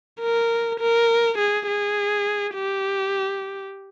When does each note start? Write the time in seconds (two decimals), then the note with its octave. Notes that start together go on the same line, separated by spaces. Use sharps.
0.20 A#4
0.80 A#4
1.38 G#4
1.68 G#4
2.55 G4